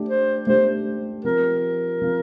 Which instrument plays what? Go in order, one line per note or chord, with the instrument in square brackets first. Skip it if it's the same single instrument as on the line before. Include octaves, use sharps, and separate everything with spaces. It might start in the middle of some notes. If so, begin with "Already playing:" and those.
Already playing: [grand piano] A3 D4 G4
[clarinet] C5
[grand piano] A3 D4 G4 [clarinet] C5
[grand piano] F3 C4 F4 [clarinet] A#4
[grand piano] F3 C4 F4